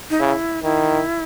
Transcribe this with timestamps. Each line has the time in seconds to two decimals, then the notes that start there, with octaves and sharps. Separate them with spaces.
0.10 D#4
0.20 C#3 E4
0.63 D#3 E4